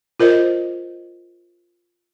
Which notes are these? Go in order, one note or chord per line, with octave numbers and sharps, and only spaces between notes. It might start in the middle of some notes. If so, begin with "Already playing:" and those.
F4 A#4 C5 D#5